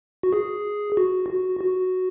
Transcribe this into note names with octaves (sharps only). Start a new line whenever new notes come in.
F#4
G#4
F#4
F#4
F#4